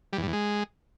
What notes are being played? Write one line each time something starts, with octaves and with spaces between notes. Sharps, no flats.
G3
E2
G2
E2
G#3